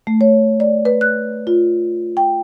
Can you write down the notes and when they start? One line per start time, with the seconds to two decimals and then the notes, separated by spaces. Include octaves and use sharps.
0.07 A3
0.21 C#5
0.60 D5
0.85 B4
1.01 F#6
1.47 F4
2.17 G5